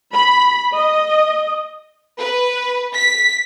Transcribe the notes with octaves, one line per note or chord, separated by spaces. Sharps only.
B5
D#5
B4
B6